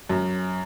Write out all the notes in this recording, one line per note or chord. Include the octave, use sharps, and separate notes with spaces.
F#2